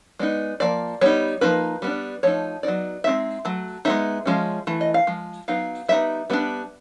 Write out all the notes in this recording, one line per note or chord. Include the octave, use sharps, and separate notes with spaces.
G#3 B3 D#4 D5
F3 A#3 D5
G3 B3 D#4 C#5
F3 A#3 D#4 B4
G3 B3 D4
F3 A3 D#4 C#5
F#3 B3 D#4 D5
G#3 C4 D#4 E5
F#3 A3
G#3 B3 D#4 E5
F3 G#3 C#4
E3 A3
D#5
F5
F3 G#3
F#3 B3 D#4 F5
G3 B3 D#4 E5
G3 B3 D4